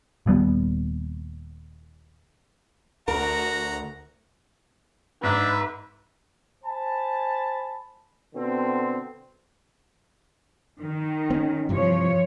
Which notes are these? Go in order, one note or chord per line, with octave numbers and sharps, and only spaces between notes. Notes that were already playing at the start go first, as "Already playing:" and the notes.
D#1 D#2 G3 B3
D2 F#4 A#4 A#5
G#2 D4 B4 E5
C5 G#5 A5 B5
B2 D3 C4
D#3
C4 C#4
G2 C3 E3 F3 C#5